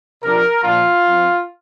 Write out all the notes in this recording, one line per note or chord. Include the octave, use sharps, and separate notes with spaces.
C3 F3 D4 A#4
A#2 F3 A#3 D4 F4
F3 C4